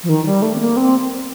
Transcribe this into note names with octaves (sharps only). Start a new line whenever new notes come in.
F3
D#3
G3
A3
C4
A#3
C4